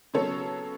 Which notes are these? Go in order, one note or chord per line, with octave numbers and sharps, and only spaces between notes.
C#3 F#3 B3 A4 C#5